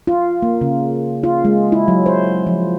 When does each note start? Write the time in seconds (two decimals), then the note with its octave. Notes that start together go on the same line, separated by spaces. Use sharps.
0.07 F4
0.42 A#3
0.61 C#3
1.23 F4
1.45 G#3
1.72 E4
1.88 F#3
2.06 C5
2.47 F3